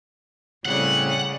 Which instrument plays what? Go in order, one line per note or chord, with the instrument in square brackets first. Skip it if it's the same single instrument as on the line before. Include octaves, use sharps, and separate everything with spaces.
[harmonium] A2 C4 [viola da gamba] C#3 G3 [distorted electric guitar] F#5